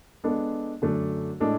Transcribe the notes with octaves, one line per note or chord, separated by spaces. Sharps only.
G#3 B3 D4 A4
F#2 D3 A3 D4
A2 G#3 D4 A4